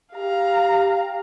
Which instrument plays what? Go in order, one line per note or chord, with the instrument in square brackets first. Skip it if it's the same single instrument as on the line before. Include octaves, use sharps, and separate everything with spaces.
[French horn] G4 [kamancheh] F5 A#5